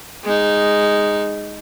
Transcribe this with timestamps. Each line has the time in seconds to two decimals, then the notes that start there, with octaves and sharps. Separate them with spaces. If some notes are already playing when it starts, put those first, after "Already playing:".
0.24 G#3 D#4